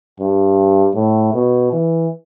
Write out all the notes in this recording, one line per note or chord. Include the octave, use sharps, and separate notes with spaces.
G2
A2
B2
E3